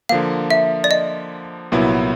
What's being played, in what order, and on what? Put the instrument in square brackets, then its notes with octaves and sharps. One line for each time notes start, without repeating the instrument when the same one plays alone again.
[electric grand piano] D3 F3 A#3 [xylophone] F5
[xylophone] E5
D5
D#5
[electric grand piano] C2 A#2 F#3 B3 E4